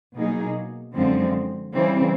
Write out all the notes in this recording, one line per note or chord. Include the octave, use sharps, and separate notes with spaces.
B2 F#3 A#3 D#4 G#4
F#2 D3 F3 G#3 C4
C#3 E3 G3 C4